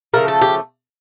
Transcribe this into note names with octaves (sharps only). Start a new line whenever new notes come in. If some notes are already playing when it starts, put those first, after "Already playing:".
C#3 F3 A3 A#4
A4
G4